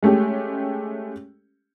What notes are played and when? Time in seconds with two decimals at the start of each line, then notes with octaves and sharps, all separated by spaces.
0.02 G#3 A3 C#4 G4